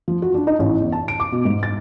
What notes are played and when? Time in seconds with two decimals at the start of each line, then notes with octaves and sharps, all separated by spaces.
0.08 F3
0.22 F#4
0.34 D4
0.47 D#4
0.59 A1
0.80 E2
0.92 A5
1.08 D7
1.20 D6
1.32 B2
1.45 G#2
1.63 A6